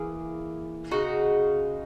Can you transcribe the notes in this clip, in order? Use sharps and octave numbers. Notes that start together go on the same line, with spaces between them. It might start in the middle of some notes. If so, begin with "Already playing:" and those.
Already playing: E3 A#3 G#4
C#3 G#3 D#4 F#4